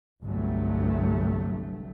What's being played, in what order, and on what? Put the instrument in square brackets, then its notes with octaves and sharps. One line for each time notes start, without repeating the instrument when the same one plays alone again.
[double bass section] G1 C2 G2 F#3 A3